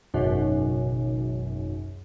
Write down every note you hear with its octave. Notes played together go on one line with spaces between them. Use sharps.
G#1 C#2 F#2 B2